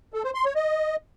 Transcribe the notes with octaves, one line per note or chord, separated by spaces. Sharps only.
A4
C5
C6
C#5
D#5